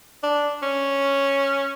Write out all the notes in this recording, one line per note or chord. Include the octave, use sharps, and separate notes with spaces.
D4
C#4